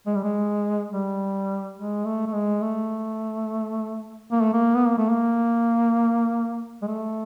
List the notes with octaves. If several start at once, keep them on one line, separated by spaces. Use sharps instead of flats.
G#3
G3
G#3
G3
G#3
A3
A3
G#3
A3
A#3
A3
A#3
B3
A#3
A3
A#3
G#3
A3